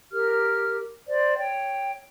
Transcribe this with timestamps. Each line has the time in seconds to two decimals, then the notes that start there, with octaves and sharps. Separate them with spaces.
0.12 G4 A#4 F6
1.07 C5 D5
1.39 C#5 G5